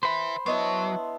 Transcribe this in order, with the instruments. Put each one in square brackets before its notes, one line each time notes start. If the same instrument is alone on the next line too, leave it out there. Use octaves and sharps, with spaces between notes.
[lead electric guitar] B4 E5 [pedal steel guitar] C5 B5
[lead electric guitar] F#3 [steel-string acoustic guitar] B3 D4 E4 [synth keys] C#5 D#5 C6